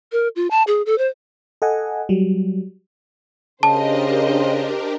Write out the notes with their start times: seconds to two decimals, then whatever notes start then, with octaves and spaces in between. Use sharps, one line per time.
0.12 A#4
0.36 F4
0.51 A5
0.67 G#4
0.86 A4
0.98 C5
1.62 A4 D#5 F#5 G#5
2.09 F#3 G3
3.63 C#3 D4 G4 A#4 C5 D#5 A5